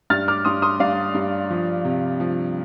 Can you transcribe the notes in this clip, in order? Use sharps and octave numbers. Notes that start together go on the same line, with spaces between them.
G2 F6 A6
D6 F6
G2 C6 D#6
C6 D#6
G2 D5 F5
G2
F3
C3
F3